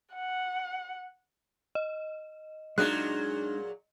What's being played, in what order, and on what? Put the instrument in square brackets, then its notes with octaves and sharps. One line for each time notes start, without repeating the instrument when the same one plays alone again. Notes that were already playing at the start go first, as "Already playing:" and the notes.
[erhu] F#5
[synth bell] D#5
[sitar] A#2 F#3 G#4 [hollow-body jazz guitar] G#3 D4 D#4 [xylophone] F#6